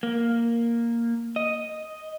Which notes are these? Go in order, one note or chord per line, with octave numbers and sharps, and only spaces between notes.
A#3
D#5